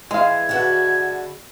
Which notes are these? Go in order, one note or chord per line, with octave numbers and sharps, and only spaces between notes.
E3 G#3 F5 G#6
D3 F#4 B4